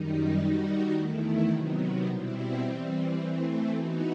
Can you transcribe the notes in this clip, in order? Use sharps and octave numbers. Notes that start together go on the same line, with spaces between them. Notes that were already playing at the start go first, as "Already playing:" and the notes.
Already playing: F#2 D#3 G3 D#4
D#3 G3 D#4 F#4
E2 D#3 A3 E4
C3 D#3 F#3 B3
B2 G3 C4 E4
E3 G3 C4
E3 A3 C4
E3 B3 D#4 F#4